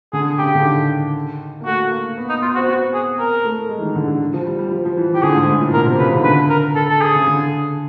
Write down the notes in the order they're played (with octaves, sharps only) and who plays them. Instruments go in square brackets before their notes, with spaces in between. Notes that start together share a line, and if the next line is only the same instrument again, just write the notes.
[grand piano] D3 [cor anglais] G#4
[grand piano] C#3 [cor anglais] G4
[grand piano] D3
D#3
A#3
[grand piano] A3 [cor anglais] F#4
[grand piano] A#3
B3
[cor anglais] D#4
[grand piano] B3 [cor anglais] F4
[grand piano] C4 [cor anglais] F#4
[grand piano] B3 [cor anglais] F#4
[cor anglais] G#4
A#4
[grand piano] A3
G#3
E3
D#3
D3
D3
F3
G3
G3
F3
F3
E3
[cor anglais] G4
[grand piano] D3 [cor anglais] G#4
[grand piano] G#2
A2
A#2
[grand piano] B2 [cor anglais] A#4
[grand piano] C3
[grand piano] C#3 [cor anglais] B4
[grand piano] D3
D#3
[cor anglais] B4
[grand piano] D3
[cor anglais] A#4
A4
A4
G#4
[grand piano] C#3
D3